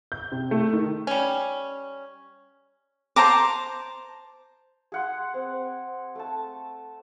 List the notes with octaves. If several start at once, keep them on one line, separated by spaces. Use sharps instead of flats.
G6
C3
A3
D#3
G3 C#4
C5 A5 A#5 D6
G#4 F#5 C6
C4
A3 A5